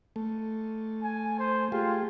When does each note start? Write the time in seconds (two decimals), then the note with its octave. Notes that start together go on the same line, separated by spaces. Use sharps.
0.16 A3
1.03 G#5
1.39 C5
1.72 A3 F4 G4 G#4